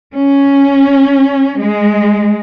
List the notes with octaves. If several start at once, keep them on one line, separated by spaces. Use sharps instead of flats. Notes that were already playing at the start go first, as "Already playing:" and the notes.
C#4
G#3